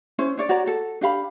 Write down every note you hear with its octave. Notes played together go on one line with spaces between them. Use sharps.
C#4 E4 C5
D4 C#5 D5
F#4 C#5 D5 A#5
F#4 A4
D4 G4 F5 B5